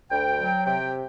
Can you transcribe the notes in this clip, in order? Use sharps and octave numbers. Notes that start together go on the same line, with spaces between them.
D2 G5
F#3
C3 G5